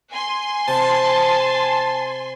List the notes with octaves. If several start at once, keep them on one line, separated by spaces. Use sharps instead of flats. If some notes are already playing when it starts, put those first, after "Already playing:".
G#5 C6
C3 A5